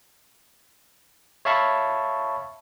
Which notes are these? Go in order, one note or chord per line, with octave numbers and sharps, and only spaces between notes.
C#5 E5 F5 A5 B5 C#6